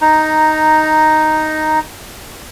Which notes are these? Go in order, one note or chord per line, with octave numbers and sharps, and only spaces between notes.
D#4 A#5